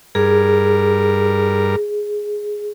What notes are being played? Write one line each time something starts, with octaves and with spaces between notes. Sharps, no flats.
G2 G#4 A#4